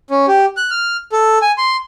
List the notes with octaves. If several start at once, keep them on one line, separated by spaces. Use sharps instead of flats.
C#4
G4
F#6
F6
A4
G#5
C6